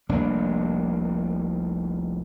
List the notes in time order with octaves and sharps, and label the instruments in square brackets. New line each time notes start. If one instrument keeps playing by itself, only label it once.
[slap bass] F1 C2 A#3 D4